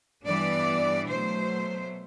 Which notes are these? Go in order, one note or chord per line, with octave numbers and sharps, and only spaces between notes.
G2 E3 G3 B3 D4 D5
B2 F#3 A3 C5